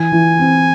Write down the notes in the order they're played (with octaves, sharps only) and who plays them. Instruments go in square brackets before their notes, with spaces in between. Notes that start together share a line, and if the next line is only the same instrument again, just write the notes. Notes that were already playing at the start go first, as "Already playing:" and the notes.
Already playing: [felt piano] E3 [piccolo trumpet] G#5
[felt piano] E3
C4